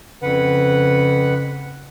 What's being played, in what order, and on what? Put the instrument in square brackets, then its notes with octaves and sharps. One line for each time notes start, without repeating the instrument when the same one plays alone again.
[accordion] F2 B4 F#5 [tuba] C#3